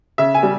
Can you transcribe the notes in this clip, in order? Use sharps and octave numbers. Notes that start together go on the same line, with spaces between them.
C#3 E5
G#5
G3